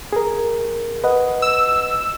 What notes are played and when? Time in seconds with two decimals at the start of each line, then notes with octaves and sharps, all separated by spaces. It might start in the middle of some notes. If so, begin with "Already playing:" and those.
0.13 G#4 A#4
1.04 B4 D#5 F#5
1.42 E6